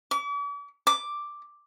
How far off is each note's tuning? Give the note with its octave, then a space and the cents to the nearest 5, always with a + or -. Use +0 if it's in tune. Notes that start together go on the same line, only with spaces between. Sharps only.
D6 -45
D6 +0